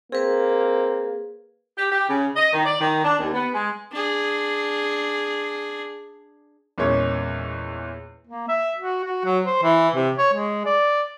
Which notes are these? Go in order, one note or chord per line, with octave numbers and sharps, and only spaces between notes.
A#3 C4 G#4 B4
G4
G4
C#3
D#5
D#3
D5
D#3
D4
D#2
B3
G#3
D4 G#4
E2 A#2 G#3 C#4 C#5
A#3
E5
F#4
F#4
F#3
C5
E3
C3
C#5
G#3
D5